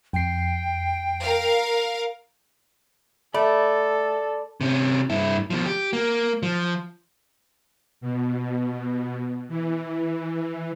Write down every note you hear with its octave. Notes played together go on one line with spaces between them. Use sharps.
F2 G5 C7
A#4 F5
A3 A4 D5 B5
C3 C#4
G2 E4
B2 F3
G4
A#3
F3
B2
E3